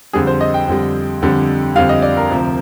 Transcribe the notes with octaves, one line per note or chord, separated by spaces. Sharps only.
F2 D3 G3 G#4
C5
D#5
G5
F2 D3 G3
F2 D3 G3
F2 D3 G3 F5
D#5
D5
A#4
D2 C3 F3